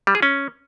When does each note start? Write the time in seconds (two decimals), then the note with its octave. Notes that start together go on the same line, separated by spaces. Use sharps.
0.07 G3
0.15 G#4
0.23 C#4